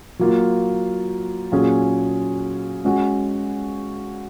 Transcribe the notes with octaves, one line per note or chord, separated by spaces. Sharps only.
F#3 A#3 F4
A#2 F#3 C#4 G#4
G#3 C#4 F#4